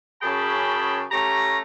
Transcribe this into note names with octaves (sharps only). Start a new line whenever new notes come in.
F#2 C#3 G#4 G5 A5 B5
A3 C#4 G4 A#5